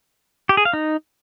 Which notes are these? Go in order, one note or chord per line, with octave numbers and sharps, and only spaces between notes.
G4
G#4
F5
D#4